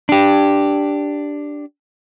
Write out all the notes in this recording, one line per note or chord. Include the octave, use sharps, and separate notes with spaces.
D4 G4